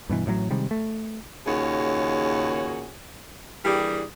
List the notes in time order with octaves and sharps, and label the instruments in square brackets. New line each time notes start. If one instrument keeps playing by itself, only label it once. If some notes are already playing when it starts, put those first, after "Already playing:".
[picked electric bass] G2 B2 E3
A1 A2 D3 F#3
C3 D#3 G3 G#3
A3
[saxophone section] D#2 A#2 C#3 F#4 G#4 C#5
E3 G3 A#3 D4 G4 G#4